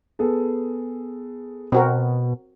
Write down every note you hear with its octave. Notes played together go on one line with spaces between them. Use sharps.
B3 G#4 A4
B2 C4 F#4 A#4